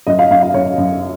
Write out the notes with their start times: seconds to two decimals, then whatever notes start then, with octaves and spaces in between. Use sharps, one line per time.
0.07 F#2 D#5
0.19 F5
0.31 F#2 F5
0.42 F5
0.54 F#2 C#5
0.78 F#2